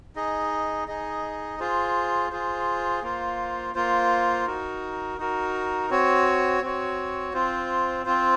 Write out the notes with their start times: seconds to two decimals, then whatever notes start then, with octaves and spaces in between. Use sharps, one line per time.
0.16 D#4 G#4 D#5
0.88 D#4 G#4 D#5
1.59 F4 G#4 C5
2.31 F4 G#4 C5
3.03 A#3 F4 C5
3.74 A#3 F4 C5
4.46 D#4 F#4 A#4
5.18 D#4 F#4 A#4
5.90 C4 F#4 C#5
6.62 C4 F#4 C#5
7.33 C4 F4 C5
8.05 C4 F4 C5